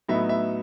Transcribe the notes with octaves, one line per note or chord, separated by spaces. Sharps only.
A2 F#3 B3 D#4 E5
E5